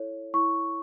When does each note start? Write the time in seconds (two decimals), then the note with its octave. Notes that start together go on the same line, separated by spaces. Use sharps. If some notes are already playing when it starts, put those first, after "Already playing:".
Already playing: E4 A4 C#5
0.34 E4 C#6